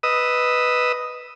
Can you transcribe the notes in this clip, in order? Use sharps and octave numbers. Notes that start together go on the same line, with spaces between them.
B4 D#5 D#6 E6